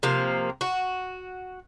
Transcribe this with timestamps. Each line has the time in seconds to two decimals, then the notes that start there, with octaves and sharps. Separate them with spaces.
0.03 C3 F3 A#3
0.61 F#4